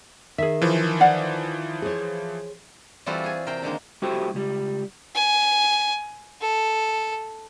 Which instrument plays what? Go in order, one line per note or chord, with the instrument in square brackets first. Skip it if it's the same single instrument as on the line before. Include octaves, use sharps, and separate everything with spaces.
[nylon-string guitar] D#3 [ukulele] G#4 E5
[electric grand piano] E3 F3
[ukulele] D5 F5 F#5
[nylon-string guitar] G#4 C5 C#5
[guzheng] E3 G3 C4 F4 F#4 A4
G#4 G#5
C3 A#4 C5 G5
D3 D#3 G#3 A#3
[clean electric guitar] G3 E4 F#4 G4 A4 C5
C#2 G3
[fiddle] G#5
A4